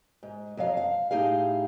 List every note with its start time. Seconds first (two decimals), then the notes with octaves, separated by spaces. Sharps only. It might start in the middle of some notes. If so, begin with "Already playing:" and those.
0.23 G#2
0.57 F2 F#3 D#5 F5
0.77 F5
1.11 A2 D#4 G4 G#4 F5